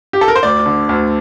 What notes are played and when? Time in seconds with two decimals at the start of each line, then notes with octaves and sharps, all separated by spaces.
0.13 G4
0.21 A4
0.28 A#4
0.35 C5
0.43 D2 D5
0.66 D3
0.89 D2